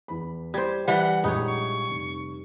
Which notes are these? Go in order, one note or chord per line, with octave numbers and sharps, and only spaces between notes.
E2 B5
G3 C5 G#6
E3 G3 F#5
A#1 G#3 D#4 C#5 B5
C#6
F1